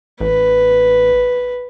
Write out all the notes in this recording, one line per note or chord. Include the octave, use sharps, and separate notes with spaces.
A1 B4